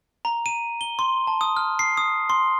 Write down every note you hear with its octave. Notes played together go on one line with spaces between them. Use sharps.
A#5
D#7
G7
C6
A5
D#6
F6
C7
D#6
C6